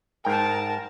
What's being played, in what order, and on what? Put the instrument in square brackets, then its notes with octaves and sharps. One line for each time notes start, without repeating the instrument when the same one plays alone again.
[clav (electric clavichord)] G#2 G5 [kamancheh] A#4 A5